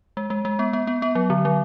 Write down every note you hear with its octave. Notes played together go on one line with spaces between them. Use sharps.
G#3
G#3
G#3
B3
B3
B3
B3
F#3
D3
F#3